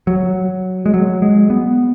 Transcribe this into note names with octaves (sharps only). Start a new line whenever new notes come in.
F#3
G#3
F#3
G#3
B3